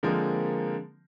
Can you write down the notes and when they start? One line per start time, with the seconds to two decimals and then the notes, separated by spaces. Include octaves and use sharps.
0.03 D3 F3 G#3 A#3 C4 A#4